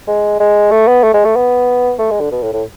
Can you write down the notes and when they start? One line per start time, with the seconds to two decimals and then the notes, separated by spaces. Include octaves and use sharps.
0.07 G#3
0.40 G#3
0.71 A3
0.88 B3
1.03 A3
1.14 G#3
1.25 A3
1.36 B3
1.99 A3
2.11 G#3
2.20 D3
2.32 B2
2.42 A2
2.53 A2